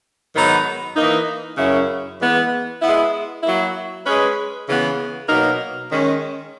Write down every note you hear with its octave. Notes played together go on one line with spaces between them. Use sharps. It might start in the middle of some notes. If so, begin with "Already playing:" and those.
G#2 D#3 F#3 B3 D#4
E3 A#3 D#4
F#2 C#3 F#3 C#4 E4
E3 G#3 B3
G#3 B3 E4
F#3 A#3 E4
G#3 C#4 G#4 B4
C#3 E3 B3
B2 F#3 A#3 D#4 A#4
D#3 G#3 C#4